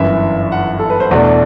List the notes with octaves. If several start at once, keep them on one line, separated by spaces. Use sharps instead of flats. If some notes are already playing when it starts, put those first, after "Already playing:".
Already playing: G1 F#2 E3 E5
F#5
A4
B4
C5
E2 B2 A3 D4 D5